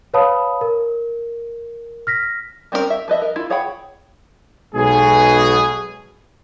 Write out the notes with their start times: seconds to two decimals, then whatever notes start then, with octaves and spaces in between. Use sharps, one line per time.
0.14 B4 C#5 F5 A5 B5 D#6
0.61 A#4
2.07 F6 A#6 B6
2.72 G3 C4 C#4 D#4 A#4
2.90 E5
3.08 F3 B4 D#5 E5
3.22 A#4
3.36 E4 F4
3.50 G#4 C#5 F#5 G5 B5
4.75 B1 B2 G#3 G#4